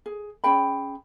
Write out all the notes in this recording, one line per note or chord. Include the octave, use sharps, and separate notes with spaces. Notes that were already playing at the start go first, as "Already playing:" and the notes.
G#4
C#4 G#4 G5 B5